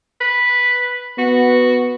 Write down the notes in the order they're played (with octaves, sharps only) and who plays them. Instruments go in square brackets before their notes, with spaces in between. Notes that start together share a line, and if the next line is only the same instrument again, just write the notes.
[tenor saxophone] B4
[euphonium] B3 [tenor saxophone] F#4